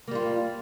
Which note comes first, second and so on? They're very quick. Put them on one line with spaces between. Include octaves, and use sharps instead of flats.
A#3 G3 F4